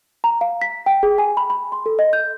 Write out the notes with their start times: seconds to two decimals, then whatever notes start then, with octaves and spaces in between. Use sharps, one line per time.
0.24 A#5
0.41 F5
0.62 B6
0.86 G5
1.03 G#4
1.18 G#5
1.37 B5
1.50 B5
1.72 C6
1.86 A4
1.99 D#5
2.13 G6